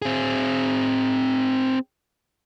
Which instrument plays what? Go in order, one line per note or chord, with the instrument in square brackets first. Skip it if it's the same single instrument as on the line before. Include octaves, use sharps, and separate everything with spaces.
[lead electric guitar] C4 G#4